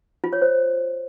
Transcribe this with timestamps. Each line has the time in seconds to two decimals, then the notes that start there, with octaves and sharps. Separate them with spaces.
0.24 F4
0.33 C#5
0.42 C5